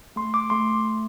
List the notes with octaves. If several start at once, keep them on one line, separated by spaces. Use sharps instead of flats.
A3 C6
D6
A3 C6